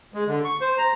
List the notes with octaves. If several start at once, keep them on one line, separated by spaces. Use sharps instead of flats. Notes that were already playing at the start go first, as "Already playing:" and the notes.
G#3
D3
C#6
C5
A#5